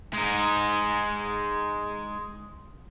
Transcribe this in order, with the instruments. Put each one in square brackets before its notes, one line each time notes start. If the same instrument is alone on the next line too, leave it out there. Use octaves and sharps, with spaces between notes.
[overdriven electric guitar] G#3 D#4